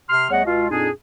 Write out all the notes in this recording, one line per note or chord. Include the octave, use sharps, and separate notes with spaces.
C3 C6 F6
E2 G3 A3 C#5 D#5 F#5
C#2 B2 F4
F2 A#2 D4 D#4 G#4